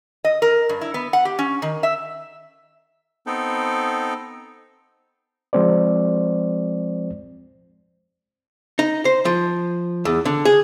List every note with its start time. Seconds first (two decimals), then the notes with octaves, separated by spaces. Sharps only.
0.24 D#5
0.42 A#4
0.69 G2
0.81 E4
0.94 B3
1.13 F#5
1.25 G4
1.39 C#4
1.62 D#3
1.83 E5
3.26 B3 C4 D#4 A4
5.53 F3 G#3 C4 C5 D5
8.79 D#4
9.05 C5
9.25 F3
10.05 E2
10.25 D3
10.45 G#4